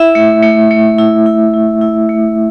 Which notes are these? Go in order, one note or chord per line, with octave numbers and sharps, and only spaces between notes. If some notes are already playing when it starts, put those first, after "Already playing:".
Already playing: E4 E5
A3
A3
A3
E4
E4
E4
E4
A3